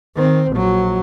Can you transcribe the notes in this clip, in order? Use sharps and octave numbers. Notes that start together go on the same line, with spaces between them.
D#3 C4
A#1 F#3